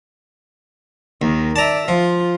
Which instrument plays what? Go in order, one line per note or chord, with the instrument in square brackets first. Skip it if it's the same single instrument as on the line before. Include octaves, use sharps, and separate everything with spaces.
[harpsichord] D#2 [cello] D#3
[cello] D5 E5 [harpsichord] A5 A#5
[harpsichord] F3 [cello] F4